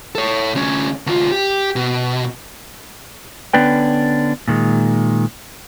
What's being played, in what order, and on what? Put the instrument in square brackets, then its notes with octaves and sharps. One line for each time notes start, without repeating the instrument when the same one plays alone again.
[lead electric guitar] A4 C#5
D2 C#4
D2 F4
G4
B2
[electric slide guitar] D3 B3 C#4 D4 B4 G5
A#2 D#3 G#3